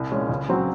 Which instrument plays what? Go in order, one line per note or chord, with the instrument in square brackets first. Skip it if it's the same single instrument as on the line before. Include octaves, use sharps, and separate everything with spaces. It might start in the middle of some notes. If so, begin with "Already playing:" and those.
Already playing: [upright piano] C2
A#2 G#3 C#4
C#2
C#3 F#3 C4 F#4